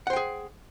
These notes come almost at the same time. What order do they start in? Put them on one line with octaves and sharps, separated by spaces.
F#5 C5 G5 G#4